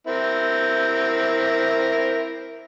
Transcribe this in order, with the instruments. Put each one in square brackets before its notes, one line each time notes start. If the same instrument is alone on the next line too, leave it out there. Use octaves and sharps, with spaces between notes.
[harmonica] C4 E4 A#4